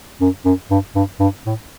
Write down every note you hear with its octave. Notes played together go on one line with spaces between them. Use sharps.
F#2
F#2
G2
G2
G2
A2